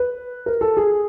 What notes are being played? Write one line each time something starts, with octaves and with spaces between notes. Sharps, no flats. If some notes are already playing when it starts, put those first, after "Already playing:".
Already playing: B4
A#4
A4
G#4